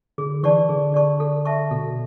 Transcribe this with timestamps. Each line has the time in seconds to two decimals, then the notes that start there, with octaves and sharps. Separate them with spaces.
0.18 D3 G#4
0.43 E3 D5 A5 C#6
0.69 D3 G#4
0.94 D3 D5 A5 C#6
1.20 A4
1.45 E5 A5 C#6
1.71 B2 A4